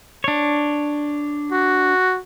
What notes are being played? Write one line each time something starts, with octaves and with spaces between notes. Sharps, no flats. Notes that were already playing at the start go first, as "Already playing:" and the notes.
D4 C#5
F#4